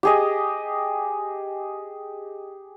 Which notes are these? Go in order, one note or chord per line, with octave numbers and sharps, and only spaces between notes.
G4 G#4 D#5